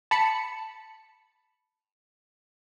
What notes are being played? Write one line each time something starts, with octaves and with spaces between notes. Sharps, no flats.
A5 B5 C#7